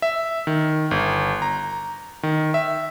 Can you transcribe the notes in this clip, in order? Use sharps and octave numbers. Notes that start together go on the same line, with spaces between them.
E5
D#3
G1
A#5
D#3
E5